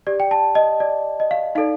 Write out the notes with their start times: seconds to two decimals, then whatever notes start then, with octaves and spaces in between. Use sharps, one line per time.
0.07 G4 D5
0.20 G5
0.31 A5
0.55 D#5
0.80 D5
1.20 D#5
1.31 F5
1.55 D#4 A4 D5 F5